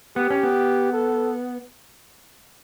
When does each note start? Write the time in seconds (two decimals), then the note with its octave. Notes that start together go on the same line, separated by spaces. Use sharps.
0.16 B3 G4
0.30 C#4
0.43 B3
0.93 A4